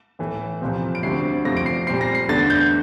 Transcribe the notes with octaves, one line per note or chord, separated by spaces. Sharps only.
A2 E3 A3
C2 A#2 F3 C4
D7
D2 D3 G3 C4 C7
F2 C3 F3 A3 A#6
D7
C7
A#2 G3 C4 C7
A#6
C7
E2 D3 A3 A6
G6